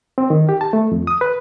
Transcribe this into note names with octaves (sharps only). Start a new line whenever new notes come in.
C4
D#3
G4
A5
A3
F2
D#6
B4